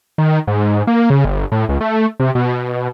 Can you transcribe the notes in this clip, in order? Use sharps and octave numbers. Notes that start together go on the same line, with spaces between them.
D#3
G#2
A#3
C#3
G1
A2
C#2
A3
C3
B2